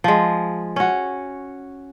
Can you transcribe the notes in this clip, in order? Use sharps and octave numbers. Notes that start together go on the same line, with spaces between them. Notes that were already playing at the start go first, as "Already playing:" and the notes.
F3 G#3
C#4 F#4